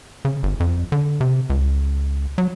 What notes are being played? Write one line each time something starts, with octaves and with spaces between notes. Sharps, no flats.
C#3
G1
F2
D3
C3
C#2
F#3